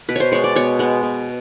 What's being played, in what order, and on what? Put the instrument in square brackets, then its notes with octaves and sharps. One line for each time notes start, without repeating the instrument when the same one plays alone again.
[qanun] B2 B4
C5 C#5
G#3 B3 C#5
D5
B2 C#5
G#3 B3
B2